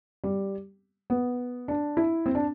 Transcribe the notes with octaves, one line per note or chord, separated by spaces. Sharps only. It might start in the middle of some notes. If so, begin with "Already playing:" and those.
G3
B3
D4
E4
C4
D4